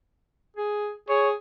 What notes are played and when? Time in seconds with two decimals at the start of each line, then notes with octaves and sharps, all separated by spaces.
0.57 G#4
1.09 G#4 C#5